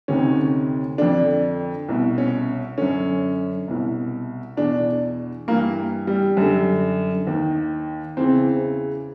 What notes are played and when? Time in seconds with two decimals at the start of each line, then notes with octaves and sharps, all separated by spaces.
0.08 D2 C3 D#3 C#4
0.98 F2 D3 D4
1.89 C2 B2
2.18 C#4
2.78 F#2 D3 C#4
3.68 C2 B2
4.57 E2 B2 D4
5.48 G2 E3 A#3
6.07 G3
6.37 F#2 D3
7.27 D#2 D#3
8.17 E2 C#3 E3 C4